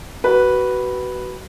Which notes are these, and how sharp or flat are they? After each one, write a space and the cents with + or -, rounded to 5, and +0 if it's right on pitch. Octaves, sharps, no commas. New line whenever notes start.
F#4 +25 B4 -5